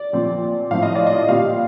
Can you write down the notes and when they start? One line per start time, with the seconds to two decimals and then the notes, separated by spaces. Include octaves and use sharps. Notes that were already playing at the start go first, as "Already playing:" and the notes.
Already playing: D5
0.13 A#2 F3 C4
0.71 A2 F3 C4 F5
0.83 D#5
0.95 D5
1.07 D#5
1.29 A#2 G3 C4 F5